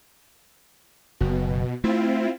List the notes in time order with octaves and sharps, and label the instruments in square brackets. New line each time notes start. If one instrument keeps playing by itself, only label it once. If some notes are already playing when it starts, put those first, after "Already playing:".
[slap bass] F#1 [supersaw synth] B2
[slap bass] A3 [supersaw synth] C4 E4 F4